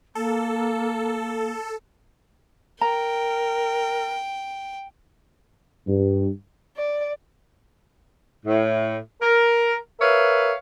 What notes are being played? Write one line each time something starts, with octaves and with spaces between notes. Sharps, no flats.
A#3 A4
A#4 G5 A#5
G2
D5
A2
A#4
A#4 B4 C#5 E5 F5